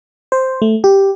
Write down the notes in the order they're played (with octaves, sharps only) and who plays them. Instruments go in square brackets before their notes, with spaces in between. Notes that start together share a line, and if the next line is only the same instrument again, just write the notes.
[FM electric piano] C5
A3
G4